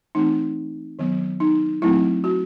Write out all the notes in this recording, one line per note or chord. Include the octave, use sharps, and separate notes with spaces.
E3 A3 C4 D#4
D#3 F#3 B3
D#4
F#3 A3 C4 E4
F#4